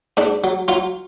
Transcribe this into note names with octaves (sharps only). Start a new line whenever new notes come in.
G#2 D4
F#3
F#3 F4